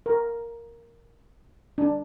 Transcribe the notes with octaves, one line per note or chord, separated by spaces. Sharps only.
A#4
D4